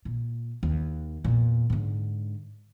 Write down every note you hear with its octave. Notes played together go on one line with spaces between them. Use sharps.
A#2
D#2
E2 A#2
G#2 D3